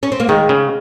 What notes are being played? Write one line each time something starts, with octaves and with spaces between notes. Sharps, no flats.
C#4
C4
A#3
D#3 G#3
C#3